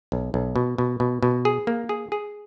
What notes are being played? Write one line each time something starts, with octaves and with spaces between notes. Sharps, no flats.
B1
B1
B2
B2
B2
B2
G#4
A#3
G#4
G#4